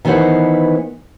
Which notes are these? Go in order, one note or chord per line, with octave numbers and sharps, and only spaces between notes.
D#3 E3 B3 D#4 C5 F#5